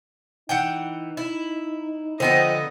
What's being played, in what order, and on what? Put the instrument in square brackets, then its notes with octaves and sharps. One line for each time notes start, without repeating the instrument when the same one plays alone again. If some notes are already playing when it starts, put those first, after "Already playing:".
[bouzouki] E3 F#5 G5 [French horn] D#4
[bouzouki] E4
[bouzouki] D3 B3 D#4 [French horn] F3 [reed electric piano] C5 G5 [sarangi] D#5